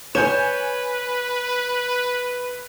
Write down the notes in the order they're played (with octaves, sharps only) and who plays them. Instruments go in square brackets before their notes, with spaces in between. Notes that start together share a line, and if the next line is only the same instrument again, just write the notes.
[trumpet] B4 [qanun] C#5 [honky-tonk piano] G#5 G6 E7